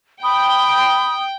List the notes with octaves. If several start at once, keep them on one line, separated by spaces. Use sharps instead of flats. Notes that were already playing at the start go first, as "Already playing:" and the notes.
G5 B5 D#6